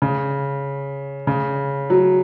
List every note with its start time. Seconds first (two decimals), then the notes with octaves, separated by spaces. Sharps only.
0.02 C#3
1.27 C#3
1.90 F#3